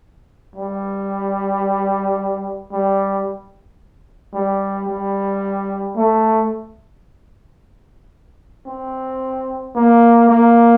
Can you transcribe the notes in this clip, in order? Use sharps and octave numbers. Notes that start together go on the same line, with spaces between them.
G3
G3
G3
G3
A3
C4
A#3
A#3